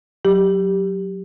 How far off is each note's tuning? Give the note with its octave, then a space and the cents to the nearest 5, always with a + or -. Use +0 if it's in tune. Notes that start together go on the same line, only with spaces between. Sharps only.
F#3 +0 G4 +0